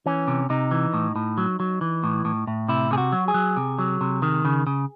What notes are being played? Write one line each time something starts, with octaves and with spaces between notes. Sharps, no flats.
E3 C#4
C3
C3 D#4
E3
A2
A2
F#3
F#3
E3
A2
A2
A2
C3 E4
C3 G#4
F#4
F#3
G#4
F#3
C3
F#3
C3
D#3
C#3
C#3